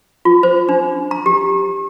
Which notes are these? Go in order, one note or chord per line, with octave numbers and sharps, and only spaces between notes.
F4
C5
D4
A#5
G4